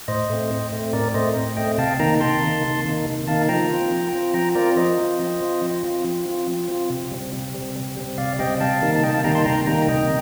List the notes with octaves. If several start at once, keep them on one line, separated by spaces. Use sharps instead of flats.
A2 C5 D#5
A3 C4
A2
A3 C4
A2 A#4 D5
A3 C4 C5 D#5
A2
A3 C4 D#5 G5
C3 F5 A5
D#3 A#3 D#4 G5 A#5
C3 A5 C6
D#3 A#3 D#4
C3
D#3 A#3 D#4
C3
D#3 A#3 D#4 F5 A5
F3 G5 A#5
C4 F4
F3
C4 F4
F3 G5 A#5
C4 F4 A#4 D5
F3 C5 D#5
C4 F4
F3
C4 F4
F3
C4 F4
F3
C4 F4
F3
C4 F4
C3
G3 C4
C3
G3 C4
C3
G3 C4
C3 D5 F5
G3 C4 D#5 G5
C3 F5 A5
D#3 G3 A#3 D#4
A5
C3 D#5 G5
F5 A5
D#3 G3 A#3 D#4 G5 A#5
A5 C6
C3 G5 A#5
D#3 G3 A#3 D#4 G5 A#5
C3 D#5 G5